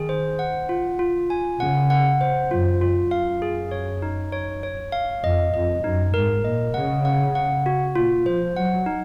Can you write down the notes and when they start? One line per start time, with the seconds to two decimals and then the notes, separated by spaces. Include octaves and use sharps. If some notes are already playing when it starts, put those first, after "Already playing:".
Already playing: D#3 G#4
0.09 C5
0.39 F#5
0.69 F4
0.99 F4
1.30 G#5
1.60 C#3 F#5
1.90 F#5
2.21 C5
2.51 F#2 F4
2.81 F4
2.96 F#2
3.11 F5
3.42 G#4
3.71 C#5
4.02 D#4
4.32 C#5
4.63 C#5
4.92 F5
5.24 F2 D#5
5.54 F2 D#5
5.84 F#2 D#4
6.14 G#2 A#4
6.44 A#2 D#5
6.74 C#3 F#5
7.05 F#5
7.35 F#5
7.66 F#4
7.96 A#2 F4
8.26 F3 C5
8.56 F#3 F#5
8.86 D#4